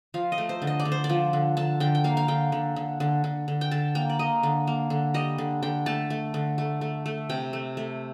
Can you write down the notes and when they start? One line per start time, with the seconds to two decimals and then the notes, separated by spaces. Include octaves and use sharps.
0.14 F3 F5
0.32 D#5
0.38 A3
0.49 C5
0.62 D3
0.67 D#5
0.80 D5
0.85 D3
0.92 C5
1.04 D5
1.09 F3
1.33 D3
1.57 D3 A5
1.80 D3 G5
1.95 G5
2.04 A#3 F5
2.17 F5
2.28 D3 G5
2.52 D3
2.76 D3
3.00 D3
3.24 D3
3.48 D3
3.61 G5
3.71 D3 A5
3.95 A#3 G5
4.10 D5
4.19 A#3 D#5
4.43 D3
4.67 A#3
4.90 D3
5.14 G3 D#5
5.38 D3
5.63 D3 G5
5.86 A3 A5
6.10 A3
6.34 D3
6.58 A3
6.81 A3
7.06 A3
7.30 C3 G5
7.53 A3
7.77 A3